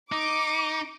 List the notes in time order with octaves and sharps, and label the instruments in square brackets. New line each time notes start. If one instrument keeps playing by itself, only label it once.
[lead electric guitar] D#4 [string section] D6